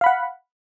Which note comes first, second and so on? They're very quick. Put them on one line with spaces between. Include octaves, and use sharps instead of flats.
F5 B5 F#5